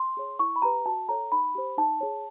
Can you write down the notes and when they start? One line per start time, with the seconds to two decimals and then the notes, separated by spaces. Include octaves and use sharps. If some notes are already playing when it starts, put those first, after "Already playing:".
Already playing: C6
0.17 G#4 C#5
0.39 E4 C#6
0.56 B5
0.62 G4 B4 A#5
0.86 F#4 A5
1.08 A4 C#5 A#5
1.32 D#4 B5
1.55 G4 C5
1.77 D#4 A5
2.01 G#4 C#5